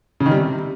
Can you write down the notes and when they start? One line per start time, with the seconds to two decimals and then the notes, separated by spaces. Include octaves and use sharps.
0.20 C#3
0.26 D#3
0.31 G3
0.37 C3